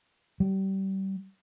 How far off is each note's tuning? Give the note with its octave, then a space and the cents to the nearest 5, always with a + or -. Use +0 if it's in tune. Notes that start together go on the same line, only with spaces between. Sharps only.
G3 -30